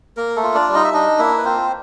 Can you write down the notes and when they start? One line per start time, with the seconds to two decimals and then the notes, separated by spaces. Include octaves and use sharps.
0.17 A#3 A#4
0.36 A3 A4
0.43 F4
0.55 D4 D5
0.69 G3
0.74 D#4 D#5
0.85 E5
0.94 D4 D#4 D#5
1.19 A#3 E4 E5
1.38 B4
1.45 C4 F4 C5